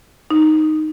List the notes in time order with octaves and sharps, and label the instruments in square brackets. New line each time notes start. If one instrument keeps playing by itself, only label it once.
[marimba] D#4